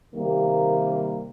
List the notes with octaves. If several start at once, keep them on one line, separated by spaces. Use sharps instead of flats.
C3 D#3 G3 A#3